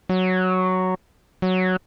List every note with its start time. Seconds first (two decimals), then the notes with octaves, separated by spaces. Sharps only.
0.09 F#3
1.42 F#3